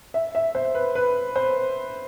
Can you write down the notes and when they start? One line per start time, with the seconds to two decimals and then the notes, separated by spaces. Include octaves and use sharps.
0.14 E5
0.35 E5
0.55 C5
0.75 B4
0.95 B4
1.36 C5